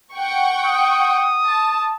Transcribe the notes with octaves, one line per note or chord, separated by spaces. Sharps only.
F#5 G5 C#6
D#6
A5